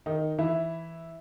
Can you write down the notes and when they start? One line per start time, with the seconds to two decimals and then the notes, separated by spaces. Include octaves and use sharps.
0.06 D#3 D#4
0.38 E3 E4